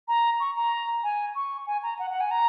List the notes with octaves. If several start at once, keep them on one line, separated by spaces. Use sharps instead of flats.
A#5
C#6
A#5
G#5
C#6
G#5
A#5
F#5
F#5
G#5
A#5